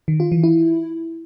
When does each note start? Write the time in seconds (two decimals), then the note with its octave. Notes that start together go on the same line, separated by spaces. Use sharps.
0.08 D#3
0.20 F4
0.32 E3
0.43 E4